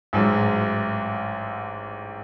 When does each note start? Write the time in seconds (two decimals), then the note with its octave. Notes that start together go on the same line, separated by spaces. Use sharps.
0.13 A1 G#2 F#3